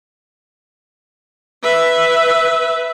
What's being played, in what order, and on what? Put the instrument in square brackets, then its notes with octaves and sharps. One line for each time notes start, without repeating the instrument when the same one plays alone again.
[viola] B4 E5